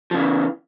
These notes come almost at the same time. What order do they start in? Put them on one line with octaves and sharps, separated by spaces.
F3 C#3 E3